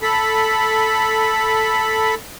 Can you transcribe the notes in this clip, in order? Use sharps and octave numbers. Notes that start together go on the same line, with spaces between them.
A4 B5